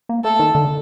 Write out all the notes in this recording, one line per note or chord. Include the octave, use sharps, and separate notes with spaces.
A#3
A3 A4
D#3
D3